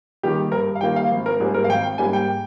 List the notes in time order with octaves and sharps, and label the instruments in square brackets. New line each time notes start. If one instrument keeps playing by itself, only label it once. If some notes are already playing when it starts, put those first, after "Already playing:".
[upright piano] D#3 G3 A#3 G4
G2 A#4
F5
D#3 G3 A#3 G5
F5
G#1
A#4
G#2 G3 A#3 G#4
A#4
F5
G#1 G5
G5
G#2 G3 A#3 G#5
G5